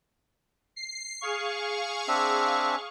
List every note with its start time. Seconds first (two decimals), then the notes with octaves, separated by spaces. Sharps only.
0.76 C7
1.21 G#4 F5 C#6
2.08 C4 D4 E5